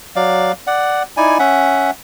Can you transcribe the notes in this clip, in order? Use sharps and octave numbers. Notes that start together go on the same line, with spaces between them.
F#3 D5 F5
D5 F#5
D#4 E4 D5 G#5
C#4 E5 F#5